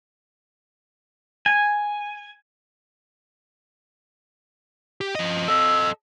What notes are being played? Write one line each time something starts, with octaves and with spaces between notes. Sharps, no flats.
G#5
G4
F3 D#5
A4 D#5 E6